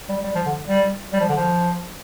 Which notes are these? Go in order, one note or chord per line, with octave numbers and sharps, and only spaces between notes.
G3
G3
F3
D3
G3
G3
F3
D3
F3